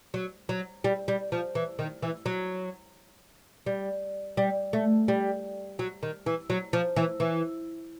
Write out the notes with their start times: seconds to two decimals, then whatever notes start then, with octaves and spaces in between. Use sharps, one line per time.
0.14 F#3
0.49 F#3
0.84 G3
1.08 G3
1.32 F3
1.55 E3
1.79 D#3
2.02 E3
2.26 F#3
3.66 G3
4.37 G3
4.73 A3
5.08 G3
5.79 F#3
6.03 D#3
6.26 E3
6.50 F#3
6.73 F3
6.96 E3
7.20 E3